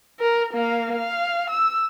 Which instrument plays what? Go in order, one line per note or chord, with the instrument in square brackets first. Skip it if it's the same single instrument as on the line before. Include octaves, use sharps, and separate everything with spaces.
[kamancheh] A#4
A#3 F5
F5
E6